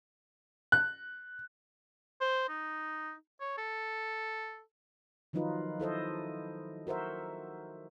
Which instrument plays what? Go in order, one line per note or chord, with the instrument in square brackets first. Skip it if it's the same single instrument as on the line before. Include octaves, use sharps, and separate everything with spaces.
[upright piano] F#6
[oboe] C5
D#4
C#5
A4
[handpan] D#3 F3 F#3 D#4 F4 B4
E4 A4 C5 D#5
F#4 A#4 C5 E5